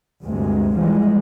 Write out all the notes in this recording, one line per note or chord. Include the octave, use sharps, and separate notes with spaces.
D2 G2 C3 G#3
E3 F3 G3 G#3